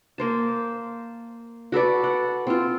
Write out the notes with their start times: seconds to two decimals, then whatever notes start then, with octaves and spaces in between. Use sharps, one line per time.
0.18 A#3 C5 A5
1.72 F#4 A4 B4 D5
2.04 F#5
2.47 C4 F4